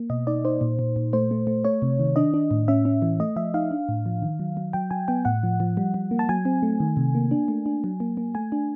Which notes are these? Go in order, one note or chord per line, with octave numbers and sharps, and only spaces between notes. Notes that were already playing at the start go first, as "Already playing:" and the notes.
Already playing: A#3
B2 D#5
D#4 D5
D#4 C5
A#2
A#2
A#2
A3 C5
A3
A3
A3 C#5
C3
D#3
D4 D#5
D4
A2
C#4 E5
C#4
E3
A3 D#5
F3 E5
D#4 F5
D4
A2
F3
D#3
F#3
F#3
F#3 G5
F#3 G#5
B3 G5
A2 F#5
F3
F3
G3
G3
A#3
A5
F#3 G#5
C4
A3
D#3
C3
A#3
D4
A3
D4
F#3
A#3
A#3
A3 G#5
D4